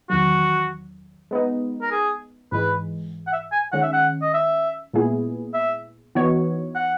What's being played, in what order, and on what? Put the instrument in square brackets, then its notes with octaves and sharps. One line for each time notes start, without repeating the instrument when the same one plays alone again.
[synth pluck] E2 D#3 F#3 [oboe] F#4
[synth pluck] G#3 B3 D#4
[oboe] A#4
G#4
[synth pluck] G#2 E3 G#3 [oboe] B4
[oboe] F#5
E5
G#5
[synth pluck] D#3 G#3 C#4 [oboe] F#5
[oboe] E5
F#5
D#5
E5
[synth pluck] A#2 G#3 B3 E4 G#4
[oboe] E5
[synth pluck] E3 B3 D#4 F#4 C#5
[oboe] F#5